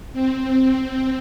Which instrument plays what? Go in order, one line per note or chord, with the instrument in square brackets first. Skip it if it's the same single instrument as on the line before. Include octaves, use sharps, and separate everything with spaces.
[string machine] C4